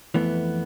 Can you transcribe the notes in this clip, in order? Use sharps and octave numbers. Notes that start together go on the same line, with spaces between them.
F2 E3 A3 B3